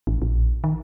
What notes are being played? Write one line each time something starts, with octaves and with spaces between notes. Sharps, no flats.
A1
A#1
D#3